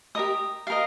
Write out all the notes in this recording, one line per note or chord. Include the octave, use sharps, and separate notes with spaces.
G4 A#4 D#5 A#5 D#6
G4 A#4 D#5 F5